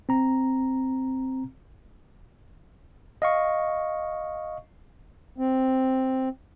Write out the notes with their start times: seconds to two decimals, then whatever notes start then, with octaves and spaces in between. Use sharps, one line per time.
0.09 C4 A#5
3.22 D#5 F5 C#6
5.38 C4